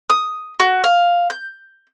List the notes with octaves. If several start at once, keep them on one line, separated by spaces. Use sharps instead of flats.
D#6
F#4
F5
G6